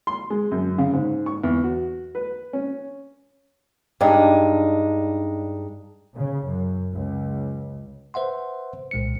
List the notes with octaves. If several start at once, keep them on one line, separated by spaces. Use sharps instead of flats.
C6
G#3
F#2
C#3
G#2
C#6
E2
F#4
B4
C#4
G2 G#3 D4 D#4
C#3
F#2
C#2
B4 C5 E5 F#5 C6
C2 A#2 G#3 C5 C#7